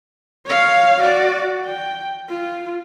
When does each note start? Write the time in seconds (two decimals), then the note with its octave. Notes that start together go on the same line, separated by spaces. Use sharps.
0.46 C#5 F5
1.00 F#4 D5
1.65 G5
2.29 F4